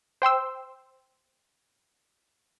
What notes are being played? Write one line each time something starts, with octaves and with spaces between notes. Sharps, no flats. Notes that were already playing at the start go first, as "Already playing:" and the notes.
C5 G5 C6 E6